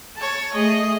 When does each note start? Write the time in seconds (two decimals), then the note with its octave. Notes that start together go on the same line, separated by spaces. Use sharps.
0.16 C#5 A5
0.54 A3 G#4 D#5